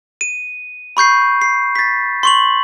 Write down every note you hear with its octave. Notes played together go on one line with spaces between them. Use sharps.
D#7
B5 C#6 G6 C7
C7
A6 B6
C6 C#6 F#7